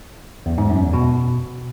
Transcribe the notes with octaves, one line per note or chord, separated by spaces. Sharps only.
E2
G#2
F#2
E2
B2